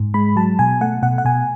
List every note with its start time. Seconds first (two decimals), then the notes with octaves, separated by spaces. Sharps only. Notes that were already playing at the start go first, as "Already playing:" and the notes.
Already playing: G#2
0.14 G#3 B5
0.36 F#3 A5
0.59 B2 G#5
0.81 A3 F#5
1.02 B2 F#5
1.18 F#5
1.25 B2 G#5